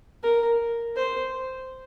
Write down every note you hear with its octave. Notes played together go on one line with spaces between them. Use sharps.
A#4
C5